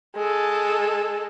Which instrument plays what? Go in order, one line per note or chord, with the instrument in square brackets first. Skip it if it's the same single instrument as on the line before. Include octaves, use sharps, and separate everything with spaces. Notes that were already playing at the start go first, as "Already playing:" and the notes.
[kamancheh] G#3 A4